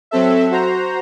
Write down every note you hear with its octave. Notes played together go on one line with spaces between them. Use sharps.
F#3 C4 A4 E5
F#4 C5 A#5